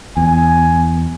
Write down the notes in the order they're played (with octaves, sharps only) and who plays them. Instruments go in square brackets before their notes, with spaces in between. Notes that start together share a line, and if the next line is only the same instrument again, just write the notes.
[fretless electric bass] E2 [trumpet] G#5